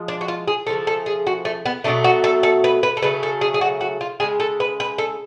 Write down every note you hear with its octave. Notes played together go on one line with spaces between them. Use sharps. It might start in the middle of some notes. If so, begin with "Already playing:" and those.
Already playing: F3 G#3
D4
F#4
F4
G#4
C#3 F3 A3 A4
A4
G#4
F#4
A3
B3
B2 F#3 A3 D4
F#4
A4
A4
B4
B4
A4
C#3 F#3 A3 B4
A4
G#4
G#4
F#4
F#4
F4
C#3 F3 G#3 G#4
A4
B4
B4
A4